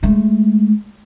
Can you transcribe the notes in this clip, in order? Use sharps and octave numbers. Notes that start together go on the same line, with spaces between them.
G#3 A3